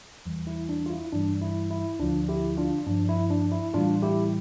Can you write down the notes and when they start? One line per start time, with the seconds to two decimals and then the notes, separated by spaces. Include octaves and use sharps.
0.26 E2 E3 G3
0.47 E4
0.69 D4
0.86 F4
0.90 E4
1.12 G2 E3 G3 D4
1.42 E4
1.71 E4
2.00 D2 D3 F3 D4 F4
2.29 E4 G4
2.57 D4 F4
2.86 G2 F3 D4
3.09 E4
3.30 D4
3.52 E4
3.74 A2 E3 G3 D4 F4
4.02 E4 G4